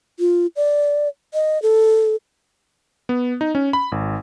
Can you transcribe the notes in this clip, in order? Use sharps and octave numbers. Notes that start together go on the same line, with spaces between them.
F4
D5
D#5
A4
B3
D#4
C#4
B5
G#1